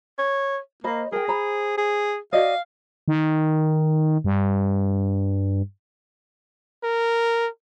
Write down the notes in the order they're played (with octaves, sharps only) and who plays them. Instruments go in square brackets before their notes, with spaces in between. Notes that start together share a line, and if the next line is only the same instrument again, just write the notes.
[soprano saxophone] C#5
[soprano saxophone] A#3 [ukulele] C5 D#5 B5
[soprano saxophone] G#4 [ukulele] A#4 G5
[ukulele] C5 A#5 B5
[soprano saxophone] G#4
[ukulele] F#4 D5 D#5 [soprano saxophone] F5
[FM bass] D#3
G2
[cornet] A#4